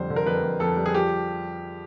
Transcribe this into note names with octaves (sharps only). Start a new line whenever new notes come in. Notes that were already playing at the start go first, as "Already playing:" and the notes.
Already playing: F2 D3 G3 C5
D3
A#4
F2 B4
F2
F2 A4
G3
G#4
F3 G4